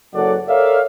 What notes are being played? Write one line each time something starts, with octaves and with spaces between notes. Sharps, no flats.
F#1 F#2 A4 C#5 D5 F#5
A4 A#4 C#5 D5 E5 F5